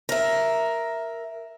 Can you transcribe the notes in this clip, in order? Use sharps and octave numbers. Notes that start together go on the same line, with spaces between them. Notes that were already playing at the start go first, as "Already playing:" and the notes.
A#4 E5